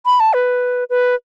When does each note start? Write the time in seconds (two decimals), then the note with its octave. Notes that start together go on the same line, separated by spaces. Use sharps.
0.06 B5
0.20 A5
0.33 B4
0.90 B4